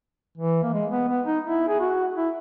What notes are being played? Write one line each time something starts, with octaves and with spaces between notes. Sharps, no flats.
E3
A#3
G#3
B3
B3
D#4
E4
G#4
F#4
E4